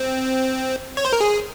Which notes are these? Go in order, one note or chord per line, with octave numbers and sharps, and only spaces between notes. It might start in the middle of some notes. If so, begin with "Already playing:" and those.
Already playing: C4
C#5
C5
A#4
G#4